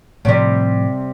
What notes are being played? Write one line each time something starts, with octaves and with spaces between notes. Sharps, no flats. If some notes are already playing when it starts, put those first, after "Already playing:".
A2 C3 F3 G3